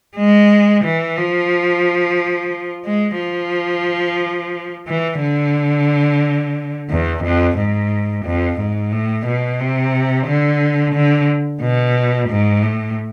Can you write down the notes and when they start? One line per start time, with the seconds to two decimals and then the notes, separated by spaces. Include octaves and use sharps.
0.16 G#3
0.84 E3
1.18 F3
2.86 G#3
3.20 F3
4.88 E3
5.22 D3
6.90 E2
7.24 F2
7.58 G#2
8.25 F2
8.59 G#2
8.92 A2
9.26 B2
9.60 C3
10.27 D3
10.95 D3
11.61 B2
12.29 G#2
12.63 A2